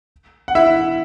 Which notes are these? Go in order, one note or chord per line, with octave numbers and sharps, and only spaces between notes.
F#5
E4 E5